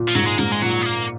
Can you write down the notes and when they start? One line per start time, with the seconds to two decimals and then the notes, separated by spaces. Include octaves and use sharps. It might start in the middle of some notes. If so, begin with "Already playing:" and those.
Already playing: A#2
0.08 F3
0.15 G#2 F#3
0.27 G#3
0.38 G#2 A#3
0.52 G#3
0.62 A#2 F#3
0.81 B3
0.86 A#3